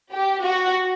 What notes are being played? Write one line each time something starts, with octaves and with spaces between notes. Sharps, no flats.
G4
F#4